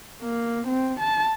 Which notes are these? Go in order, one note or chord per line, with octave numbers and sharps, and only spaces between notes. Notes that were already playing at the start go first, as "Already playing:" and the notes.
A#3
C4
A5